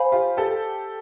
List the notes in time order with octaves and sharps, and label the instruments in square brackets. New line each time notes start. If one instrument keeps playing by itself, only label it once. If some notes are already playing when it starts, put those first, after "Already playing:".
Already playing: [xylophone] C5 F5 G#5 B5
[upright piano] F4 G4
G4 A4